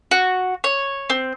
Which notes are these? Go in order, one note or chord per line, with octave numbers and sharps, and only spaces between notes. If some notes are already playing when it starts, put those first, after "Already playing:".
F#4
C#5
C4